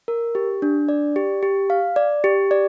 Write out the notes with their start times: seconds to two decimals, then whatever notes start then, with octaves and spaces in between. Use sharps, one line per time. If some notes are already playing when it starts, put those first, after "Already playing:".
0.08 A#4
0.35 G4
0.62 D4
0.89 D5
1.16 G4
1.43 G4
1.70 F5
1.96 D5
2.24 G4
2.51 D5